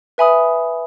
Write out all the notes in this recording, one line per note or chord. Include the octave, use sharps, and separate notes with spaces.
B4 E5 G#5 B5 D#6